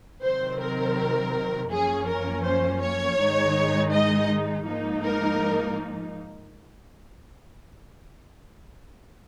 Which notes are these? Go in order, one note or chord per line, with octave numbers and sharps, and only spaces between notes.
C3 D#3 F#3 C4 C5
A#4
F#2 F3 A#3 C#4 G#4
A#4
C5
C#5
G#2 D#3 G#3 D#4
D#5
G#2 F3 A#3 D#4
A#4